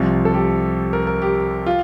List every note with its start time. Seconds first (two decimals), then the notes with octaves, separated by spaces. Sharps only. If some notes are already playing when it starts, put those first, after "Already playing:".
Already playing: C2 C3 F3
0.25 A4
0.34 G4
0.93 A#4
1.07 A#4
1.22 G4
1.66 F4